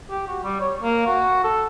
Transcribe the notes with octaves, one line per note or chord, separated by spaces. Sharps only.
G4
F#4
G3
C#5
A#3
F#4
A4